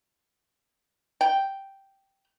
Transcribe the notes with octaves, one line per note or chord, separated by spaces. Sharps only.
G5